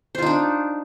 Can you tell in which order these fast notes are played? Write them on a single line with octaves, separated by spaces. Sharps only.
C5 F4 D#4 D4